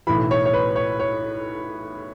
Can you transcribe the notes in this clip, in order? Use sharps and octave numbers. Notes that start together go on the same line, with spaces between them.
B1 A2 E3 B5
C#5
C#5
B4
C#5
C#5